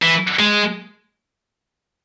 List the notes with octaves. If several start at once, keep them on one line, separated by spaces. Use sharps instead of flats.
E3
G#3